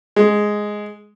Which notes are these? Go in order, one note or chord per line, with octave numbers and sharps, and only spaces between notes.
G#3